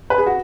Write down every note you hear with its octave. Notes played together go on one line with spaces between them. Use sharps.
B4
G#4
F#4